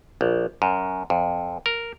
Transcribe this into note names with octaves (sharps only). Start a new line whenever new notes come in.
A#1
F#2
F2
A#4